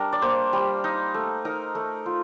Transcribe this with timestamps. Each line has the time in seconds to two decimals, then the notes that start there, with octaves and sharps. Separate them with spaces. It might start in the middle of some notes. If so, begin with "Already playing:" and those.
Already playing: G3 D4 A#4
0.12 D5
0.22 A#3 C5
0.53 G3
0.84 D#4
1.14 A3
1.45 D#4 A#4
1.75 A3
2.06 F4